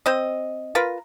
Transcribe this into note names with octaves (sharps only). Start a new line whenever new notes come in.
C4 D#5
F4 A#4 B4